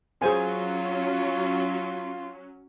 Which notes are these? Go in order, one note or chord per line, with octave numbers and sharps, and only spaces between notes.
F#3 C#4 F4 G#4 C5 G#5